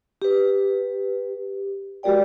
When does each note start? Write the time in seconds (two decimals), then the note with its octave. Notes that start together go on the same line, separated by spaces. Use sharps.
0.22 G4 B4
2.03 G#3 F#4 G4 A#4 D5 G5